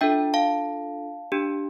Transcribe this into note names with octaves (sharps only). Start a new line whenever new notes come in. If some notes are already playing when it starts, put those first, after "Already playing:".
D4 F4 A4 E5 G5
F5 A5
D4 G4